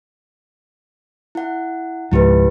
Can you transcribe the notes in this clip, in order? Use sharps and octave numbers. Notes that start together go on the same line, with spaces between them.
E4 F#5
C#2 G#2 F3 E4 G4 B4